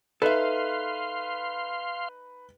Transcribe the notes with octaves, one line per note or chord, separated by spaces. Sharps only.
D#4 A4 B4 E5 F5 C6